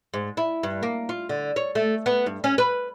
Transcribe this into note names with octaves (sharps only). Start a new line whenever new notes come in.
G#2
E4
G2
A#3
F4
D3
C#5
A3
B3
G2
C#4
B4